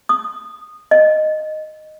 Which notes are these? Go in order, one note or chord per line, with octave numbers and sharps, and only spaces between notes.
D#6
D#5